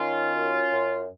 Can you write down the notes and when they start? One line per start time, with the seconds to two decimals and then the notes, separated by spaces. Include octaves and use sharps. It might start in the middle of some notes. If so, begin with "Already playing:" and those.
Already playing: D#3 C#4 F4
0.32 F#2
0.71 F#2